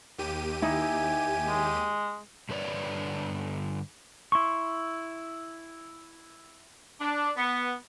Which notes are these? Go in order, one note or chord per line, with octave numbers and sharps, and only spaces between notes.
D#2 G4 D#7
D#4 E4 G#5
G#3
G2 D3 B4 C#5 D5
E4 C6 C#6
D4
B3